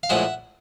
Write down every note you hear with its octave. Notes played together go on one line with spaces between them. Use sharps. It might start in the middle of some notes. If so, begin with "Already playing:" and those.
F5
A#1 A2 F3 G#3 E5 F#5